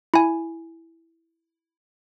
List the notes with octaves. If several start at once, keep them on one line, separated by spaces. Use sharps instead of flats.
E4 G#5